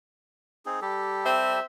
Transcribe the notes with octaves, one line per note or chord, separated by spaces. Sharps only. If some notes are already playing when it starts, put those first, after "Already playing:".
C4 D#4 G#4
G3 G4 A4
C4 C5 E5